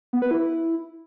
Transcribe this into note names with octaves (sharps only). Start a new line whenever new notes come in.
B3
B4
E4